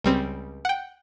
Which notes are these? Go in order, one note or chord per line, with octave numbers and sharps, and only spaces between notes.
C#2 G3 C4
F#5 G5